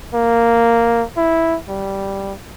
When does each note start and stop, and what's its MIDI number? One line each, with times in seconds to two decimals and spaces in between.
0.15 1.04 58
1.17 1.57 64
1.69 2.33 55